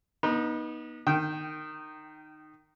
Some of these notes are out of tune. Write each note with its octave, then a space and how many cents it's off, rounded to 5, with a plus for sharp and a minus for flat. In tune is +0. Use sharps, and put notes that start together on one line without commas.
B3 -30 D#4 +0
D#3 -15 G5 -10